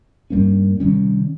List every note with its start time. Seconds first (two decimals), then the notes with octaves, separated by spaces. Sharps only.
0.30 G2 G3 A#3 C#4
0.80 C3 D#3 G3 C#4